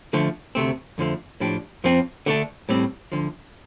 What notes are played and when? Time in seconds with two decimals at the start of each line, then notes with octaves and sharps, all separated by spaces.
0.13 D3 F3 A3
0.55 D2 C3 A3 C4
0.98 F2 D3 F3 A3
1.40 A2 F3 D4 G4
1.84 F2 F3 C4 F4
2.26 D3 A3 D4
2.69 A2 G3 C4
3.12 D2 D3 F3